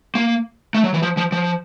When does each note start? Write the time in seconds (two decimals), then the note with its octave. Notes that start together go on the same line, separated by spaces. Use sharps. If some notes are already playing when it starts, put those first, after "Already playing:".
0.15 A#3
0.74 A3
0.84 F#3
0.94 E3
1.02 F3
1.17 F3
1.32 F3